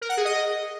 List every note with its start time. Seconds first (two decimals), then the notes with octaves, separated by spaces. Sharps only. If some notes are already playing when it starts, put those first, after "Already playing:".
0.01 A#4
0.09 F#5
0.17 G#4
0.25 D#5